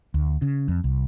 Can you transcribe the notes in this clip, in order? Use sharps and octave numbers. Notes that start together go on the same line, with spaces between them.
D2
C#3
F2
C2